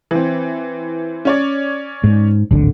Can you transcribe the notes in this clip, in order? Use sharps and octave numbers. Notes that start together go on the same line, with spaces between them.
E3 C4
C#4 C#5 D5
G#2
D1 G#1 D3